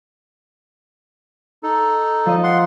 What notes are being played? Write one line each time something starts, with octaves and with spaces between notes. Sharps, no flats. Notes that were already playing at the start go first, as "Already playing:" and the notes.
D#4 A4
F3 D#5
F#5 C6